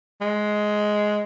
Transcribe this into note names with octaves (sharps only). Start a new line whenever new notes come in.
G#3